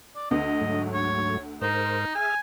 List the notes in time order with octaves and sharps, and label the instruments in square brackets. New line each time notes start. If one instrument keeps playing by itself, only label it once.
[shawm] D5
[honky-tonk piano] D2 [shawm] D#5
[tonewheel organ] G#2 F#3 A3
[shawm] C#5
[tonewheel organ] G#2 A#4 C5 [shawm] D#4
[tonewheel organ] G#4 E5 F6 [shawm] G#5